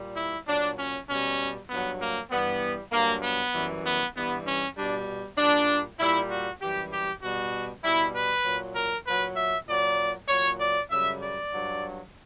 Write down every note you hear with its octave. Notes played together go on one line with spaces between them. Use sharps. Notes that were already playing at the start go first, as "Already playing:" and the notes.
Already playing: A#2 G3
E4
A#2 F#3 D4
C#4
B2 G3 C#4
G2 F#3 B3
A#3
G2 E3 G3 B3
G2 F#3 A#3
B3
F#2 E3 G3
B3
G2 E3 G3 B3
C#4
B2 G3 D4
A#2 G3 D4
A#2 G3 E4
F#4
F#2 E3 G3 G4
G4
B2 G3 F#4
B2 G3 E4
B4
A#2 F#3
A#4
A#2 F#3 B4
E5
A#2 F#3 D5
A#2 F#3 C#5
D5
F#2 C#3 G3 E5
D5
G2 F#3